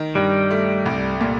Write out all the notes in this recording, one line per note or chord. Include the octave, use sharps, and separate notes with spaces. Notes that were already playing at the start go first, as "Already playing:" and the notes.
Already playing: D#3
G2 G3
A3
C2
A#2